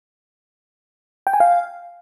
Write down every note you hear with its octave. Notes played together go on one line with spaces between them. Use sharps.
G5
G#5
F5